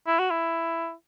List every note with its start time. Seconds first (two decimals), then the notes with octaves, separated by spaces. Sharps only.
0.07 E4
0.19 F#4
0.31 E4